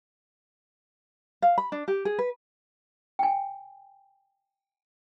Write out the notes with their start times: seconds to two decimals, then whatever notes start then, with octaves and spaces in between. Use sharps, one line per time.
1.42 F5
1.58 B5
1.72 D4
1.88 G4
2.05 G#4
2.19 B4
3.19 G5 G#5